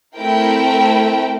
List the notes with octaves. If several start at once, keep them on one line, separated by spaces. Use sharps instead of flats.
A3 C4 E4 A#4 G5